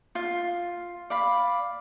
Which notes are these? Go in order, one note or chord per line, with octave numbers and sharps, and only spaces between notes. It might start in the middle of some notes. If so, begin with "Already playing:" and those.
F4 F5
D5 F5 B5